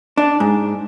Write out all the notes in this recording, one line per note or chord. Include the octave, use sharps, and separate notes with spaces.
D4
G#2